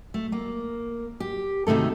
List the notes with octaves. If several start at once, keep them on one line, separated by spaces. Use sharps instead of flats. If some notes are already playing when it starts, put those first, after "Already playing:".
A3
A#3
G4
D2 C3 D#3 A3 A4